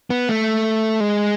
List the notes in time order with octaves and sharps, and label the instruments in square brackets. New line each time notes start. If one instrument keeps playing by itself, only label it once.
[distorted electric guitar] B3
A3
G#3